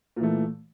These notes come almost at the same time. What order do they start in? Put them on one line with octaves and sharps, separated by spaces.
A#2 E3 A3